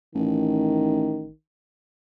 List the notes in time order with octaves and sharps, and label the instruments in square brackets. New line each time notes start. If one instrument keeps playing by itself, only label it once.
[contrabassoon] A1 [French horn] D#3